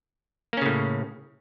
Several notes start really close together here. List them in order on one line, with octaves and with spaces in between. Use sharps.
A#3 C#4 C#3 A2